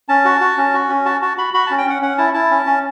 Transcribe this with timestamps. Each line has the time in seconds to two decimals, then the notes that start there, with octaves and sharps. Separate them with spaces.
0.09 C#4 A5
0.25 F#4
0.41 F#4
0.57 C#4
0.74 F#4
0.89 C#4
1.05 F#4 A5
1.22 F#4 A5
1.37 F#4 B5
1.54 F#4 B5
1.67 A5
1.70 C#4
1.78 G5
1.86 C#4 F#5
2.02 C#4 F#5
2.18 E4 A5
2.34 E4 A5
2.51 C#4
2.66 C#4